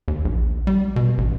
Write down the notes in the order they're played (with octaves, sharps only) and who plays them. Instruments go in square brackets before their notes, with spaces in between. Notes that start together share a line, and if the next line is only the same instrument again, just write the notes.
[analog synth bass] D#2
A#1
G3
B2
A1